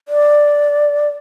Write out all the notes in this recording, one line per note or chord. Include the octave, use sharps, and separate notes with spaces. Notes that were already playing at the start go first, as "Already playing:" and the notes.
D5